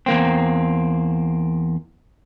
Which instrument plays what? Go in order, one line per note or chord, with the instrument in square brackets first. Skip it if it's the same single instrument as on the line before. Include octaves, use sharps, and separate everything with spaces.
[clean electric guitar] E2 A#3 C4